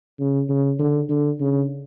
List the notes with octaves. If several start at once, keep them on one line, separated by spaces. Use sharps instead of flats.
C#3
C#3
D3
D3
C#3